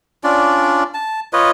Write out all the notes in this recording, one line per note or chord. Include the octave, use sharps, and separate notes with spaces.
C#4 D4 F4 D5
A5
F4 B4 C#5 D#5